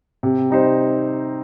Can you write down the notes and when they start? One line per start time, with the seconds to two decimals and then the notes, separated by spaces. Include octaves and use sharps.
0.23 C3
0.50 G3 D#4 C5